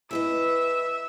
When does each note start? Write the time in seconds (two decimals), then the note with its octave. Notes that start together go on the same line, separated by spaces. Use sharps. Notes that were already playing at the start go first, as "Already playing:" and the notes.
0.11 E3 B4 D#5 E5